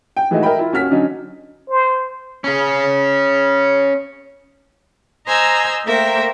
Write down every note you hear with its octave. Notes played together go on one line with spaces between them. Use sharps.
G5
E3 G#3 A3 D#4 F#4
A#4 D#5 E5 G5 B5
E4 F4
D#1 C#4 F#4 F6 B6
D3 F#3 C#4 D#4
C5
C#4 G#4
C5 D#5 G#5 A#5 E6
A3 A#3 A#4 C5 E5 G5